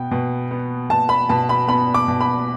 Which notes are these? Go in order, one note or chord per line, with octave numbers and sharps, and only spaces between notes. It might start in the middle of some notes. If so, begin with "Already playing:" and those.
Already playing: B2 B3 G5
B2
B3
B2 A5
B5
B2 A5
B5
B3 B5
D6
B2
B5